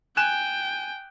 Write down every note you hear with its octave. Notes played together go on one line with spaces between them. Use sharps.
G5 G#5 F#6 E7